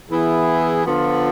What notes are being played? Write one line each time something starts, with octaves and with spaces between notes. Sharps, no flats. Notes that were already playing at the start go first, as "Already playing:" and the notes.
E3 B3 E4 G#4
D3 F3 B3 F4